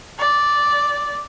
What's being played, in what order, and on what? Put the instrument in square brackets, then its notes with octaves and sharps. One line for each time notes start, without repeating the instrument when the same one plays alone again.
[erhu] D5